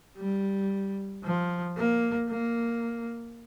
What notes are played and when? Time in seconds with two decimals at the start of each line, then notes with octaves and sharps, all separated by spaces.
0.18 G3
1.24 F3
1.77 A#3
2.30 A#3